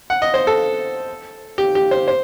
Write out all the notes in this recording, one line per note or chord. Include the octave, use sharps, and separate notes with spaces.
F#5
D#5
C5
A4
G4
G4
C5
C5